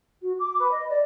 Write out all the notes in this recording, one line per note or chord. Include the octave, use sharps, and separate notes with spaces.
F#4
D6
B4
D#5
D5